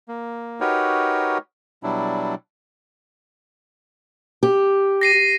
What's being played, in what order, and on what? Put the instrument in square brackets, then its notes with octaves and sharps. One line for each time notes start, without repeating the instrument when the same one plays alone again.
[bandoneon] A#3
D#4 F#4 G4 A#4 B4 C#5
B2 F#3 G3 D4 E4
[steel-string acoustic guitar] G4
[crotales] A#6 C7 D#7